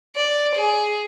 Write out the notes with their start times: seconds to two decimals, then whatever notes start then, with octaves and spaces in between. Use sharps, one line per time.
0.16 D5
0.55 G#4